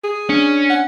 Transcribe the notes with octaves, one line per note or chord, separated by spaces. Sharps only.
G#4
C#4 D4
F#5